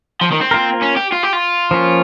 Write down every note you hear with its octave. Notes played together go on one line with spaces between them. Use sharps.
F3
D#3
C4
A#3 F4 A#4
C#4
G4
F4
G4
F4
F3 A#3 C#4